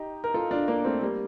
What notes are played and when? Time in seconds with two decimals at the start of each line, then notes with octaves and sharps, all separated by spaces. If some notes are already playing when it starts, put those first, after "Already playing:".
Already playing: D#4 G4
0.24 A#4
0.34 F4 A4
0.51 D4 F4
0.68 A#3 D4
0.84 A3 C4
1.01 G3 A#3